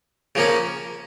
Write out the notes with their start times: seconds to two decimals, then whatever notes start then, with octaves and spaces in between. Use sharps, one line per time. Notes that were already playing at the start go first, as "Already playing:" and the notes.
0.35 C#3 F3 A#3 C#4